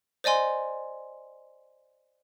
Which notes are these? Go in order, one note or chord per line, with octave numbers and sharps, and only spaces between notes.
C5 D5 D#5 G#5 C6